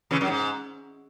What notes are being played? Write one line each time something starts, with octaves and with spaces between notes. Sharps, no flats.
C#3 E3
F#2
G#2